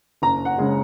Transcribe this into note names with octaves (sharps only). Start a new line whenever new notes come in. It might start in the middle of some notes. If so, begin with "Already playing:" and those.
F#1 A#5
F#5
C#3 G#3